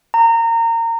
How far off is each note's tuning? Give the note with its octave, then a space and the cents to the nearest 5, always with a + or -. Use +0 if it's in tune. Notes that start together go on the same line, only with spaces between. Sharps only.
A#5 -25